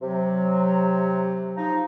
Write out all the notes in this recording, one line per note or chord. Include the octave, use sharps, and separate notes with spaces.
C3 F#3
F3 D#4